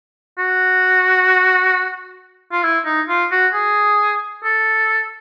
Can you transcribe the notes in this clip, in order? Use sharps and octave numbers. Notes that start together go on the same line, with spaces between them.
F#4
F4
E4
D#4
F4
F#4
G#4
A4